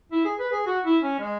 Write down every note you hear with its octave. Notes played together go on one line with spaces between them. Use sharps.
E4
G#4
B4
G#4
F#4
E4
C#4
G#3